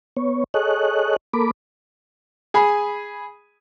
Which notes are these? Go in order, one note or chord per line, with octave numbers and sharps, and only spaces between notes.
B3 C#5
G#4 A4 C#5 D#5 F#6
A#3 A4 A#4 B5 D6
G#4 G#5 B5